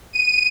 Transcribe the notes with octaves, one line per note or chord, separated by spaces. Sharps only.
D#7